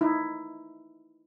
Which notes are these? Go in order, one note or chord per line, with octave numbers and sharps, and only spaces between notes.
D#4 E4